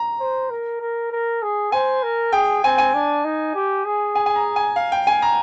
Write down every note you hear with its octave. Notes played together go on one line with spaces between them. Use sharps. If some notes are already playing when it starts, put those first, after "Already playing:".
Already playing: A#5
C5
A#4
A#4
A#4
G#4
C5 G#5
A#4
G#4 G5
C4 G#5
G#5
D4
D#4
G4
G#4
G#5
G#5
A#5
G#5
F5
G5
G#5
A#5